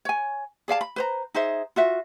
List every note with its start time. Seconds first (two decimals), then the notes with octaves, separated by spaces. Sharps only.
0.05 C#5 G#5
0.68 G#4 D5 F5 A5
0.81 B5
0.96 B4 C5 A#5
1.34 D#4 G#4 C5 E5
1.76 F4 F#4 E5